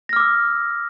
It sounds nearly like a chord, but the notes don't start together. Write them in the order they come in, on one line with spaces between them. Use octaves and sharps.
A#6 F6 D6 E6